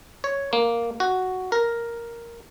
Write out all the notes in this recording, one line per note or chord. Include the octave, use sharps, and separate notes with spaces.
C#5
A#3
F#4
A#4